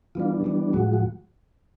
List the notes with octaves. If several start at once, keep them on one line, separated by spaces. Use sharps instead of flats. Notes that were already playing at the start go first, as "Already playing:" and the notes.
E3 G3 B3 D4 F4
E3 G3 B3 D4
A2 F3 G#3 F#4
F#4